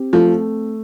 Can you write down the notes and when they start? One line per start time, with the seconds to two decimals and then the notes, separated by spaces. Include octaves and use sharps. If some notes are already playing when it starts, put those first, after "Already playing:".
Already playing: C4 G4
0.13 F3 A3